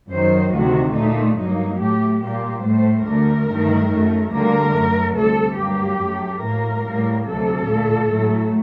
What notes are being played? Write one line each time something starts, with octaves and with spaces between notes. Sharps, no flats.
F#2 D#3 F#3 C5
D2 C3 D#3 F#4
A#2 A3 D#4
G2 F#3 A#3 D#4
A2 A3 G4
A#2 G3 A#3 G4
A2 A3 C5
D2 D3 A3 A#4
G2 D#3 F#3 A3
F#2 F#3 A3
D2 D3 G3 A#3 A#4
F#2 F#3 A3
D2 C3 G3 A4
G2 F#3 A#3 G4
F#2 F#3 A3
A2 F#3 A#3 A#4
A2 G3 A#3
D2 C3 F#3 A4
A#2 A3
A2 F#3 A3